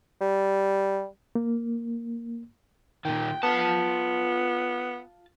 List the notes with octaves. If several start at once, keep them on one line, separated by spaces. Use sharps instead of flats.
G3
A#3
A#2 D#3 G5
B3 F4 A5